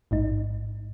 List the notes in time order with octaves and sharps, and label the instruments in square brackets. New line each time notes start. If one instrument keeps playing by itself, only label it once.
[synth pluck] A1 G#2 D#4